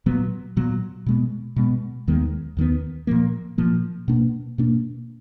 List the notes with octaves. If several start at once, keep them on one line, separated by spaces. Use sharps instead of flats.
A#2 F#3 B3
A#2 F#3 B3
B2 G#3 B3
B2 G#3 B3
D#2 D#3 G#3 B3
D#2 D#3 G#3 B3
A#2 F3 A#3
A#2 F3 A#3
B2 A#3 D4
B2 A#3 D4